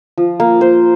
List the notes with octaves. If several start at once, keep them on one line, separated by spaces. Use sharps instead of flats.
F3
A#3
C5